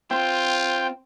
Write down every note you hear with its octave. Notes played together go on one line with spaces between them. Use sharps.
C4 F4 G5